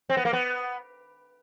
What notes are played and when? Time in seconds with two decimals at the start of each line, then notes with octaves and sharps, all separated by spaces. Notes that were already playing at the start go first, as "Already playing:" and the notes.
0.10 C4
0.17 B3
0.25 A#3
0.33 B3